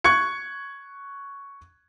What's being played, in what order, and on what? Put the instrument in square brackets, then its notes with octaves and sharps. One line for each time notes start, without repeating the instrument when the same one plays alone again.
[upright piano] C#6 F#6 G#6 C#7